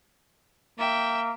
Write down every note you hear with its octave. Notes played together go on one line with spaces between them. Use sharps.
A#3 E5 G5